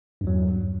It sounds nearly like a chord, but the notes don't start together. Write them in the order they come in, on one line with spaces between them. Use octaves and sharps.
G2 E2 F#3